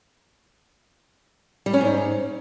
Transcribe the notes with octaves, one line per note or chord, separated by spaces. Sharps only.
G3
C#4
G#2